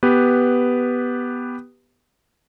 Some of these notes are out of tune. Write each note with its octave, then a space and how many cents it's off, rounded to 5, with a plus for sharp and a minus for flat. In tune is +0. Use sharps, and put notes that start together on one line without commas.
B3 +0 G4 +0 B4 +0